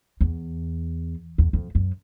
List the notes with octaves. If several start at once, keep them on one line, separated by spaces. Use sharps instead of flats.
E2
E2
F2
F#2